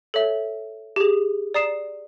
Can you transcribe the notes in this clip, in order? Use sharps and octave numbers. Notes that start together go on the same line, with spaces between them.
A4 C#5 E5
G4 G#4
D5 A#5 D#6 C7 E7